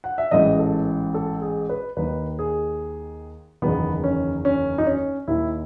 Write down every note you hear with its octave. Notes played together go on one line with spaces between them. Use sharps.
F#5
E5
A1 G#2 E3 D#5
A4
A4
G#4
B4
D#2 D#3 B4
G#4
F#1 E2 D#3 B3
C#4
C#4
D#4
C#4
D#2 D#3 E4